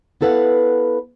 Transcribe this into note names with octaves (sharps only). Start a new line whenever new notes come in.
B3 E4 A4 B4 F5 F#5